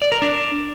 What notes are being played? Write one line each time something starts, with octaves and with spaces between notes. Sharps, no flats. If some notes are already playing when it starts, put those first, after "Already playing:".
D5
A#4
D4